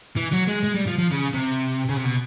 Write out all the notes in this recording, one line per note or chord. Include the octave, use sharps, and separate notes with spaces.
E3
F#3
G#3
G#3
G3
F3
F3
C#3
C3
C#3
C3
B2